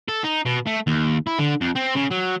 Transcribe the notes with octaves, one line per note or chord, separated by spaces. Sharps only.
A4
D#4
B2
A3
D#2
E4
D3
F2
C4
C#3
F#3